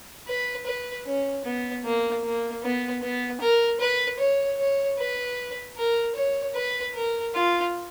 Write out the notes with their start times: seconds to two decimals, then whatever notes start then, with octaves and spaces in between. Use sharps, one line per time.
0.28 B4
0.66 B4
1.06 C#4
1.45 B3
1.84 A#3
2.23 A#3
2.63 B3
3.02 B3
3.41 A#4
3.80 B4
4.19 C#5
4.59 C#5
4.98 B4
5.77 A#4
6.16 C#5
6.55 B4
6.94 A#4
7.34 F4